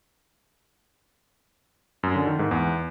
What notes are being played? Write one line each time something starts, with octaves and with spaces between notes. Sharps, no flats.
F#2
D3
D#3
G#2
E2